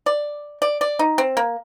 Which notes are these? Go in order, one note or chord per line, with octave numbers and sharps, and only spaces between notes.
D5
D5
D5
D#4
C4
A#3